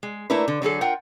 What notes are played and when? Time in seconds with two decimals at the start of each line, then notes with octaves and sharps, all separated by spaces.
0.03 G#3
0.30 A3 A#3 D4 E4 A#4 B4
0.48 D3
0.62 D3 F#3 G#4 A4
0.81 F4 A#4 F#5 G5